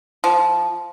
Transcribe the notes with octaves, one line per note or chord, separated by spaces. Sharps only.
F3